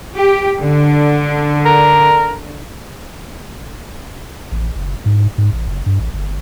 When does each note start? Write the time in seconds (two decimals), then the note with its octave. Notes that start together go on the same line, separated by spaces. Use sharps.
0.16 G4
0.62 D3
1.65 A#4
4.52 A1
4.76 F#1
5.06 G#2
5.38 G#2
5.53 A1
5.68 F#1
5.86 G2
6.00 A1
6.14 G1